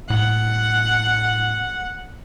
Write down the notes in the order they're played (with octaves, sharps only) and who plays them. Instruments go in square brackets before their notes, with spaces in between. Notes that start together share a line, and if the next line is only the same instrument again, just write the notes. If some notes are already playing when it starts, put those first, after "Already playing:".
[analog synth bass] A2 [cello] F#5